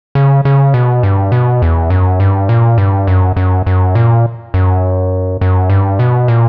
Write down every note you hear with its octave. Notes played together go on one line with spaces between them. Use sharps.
C#3
C#3
B2
G2
B2
E2
F#2
G2
A#2
G2
F#2
F#2
F#2
A#2
F#2
F#2
G2
B2
A#2